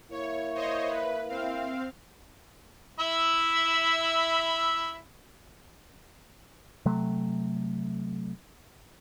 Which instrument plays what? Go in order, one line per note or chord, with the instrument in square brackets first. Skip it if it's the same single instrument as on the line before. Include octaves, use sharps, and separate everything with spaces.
[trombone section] A#3 E4 [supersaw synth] C#5
[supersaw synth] C5 C#5 D#5
B4
C4 F5
[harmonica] E4 E5 B5
[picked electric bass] C3 F#3 A3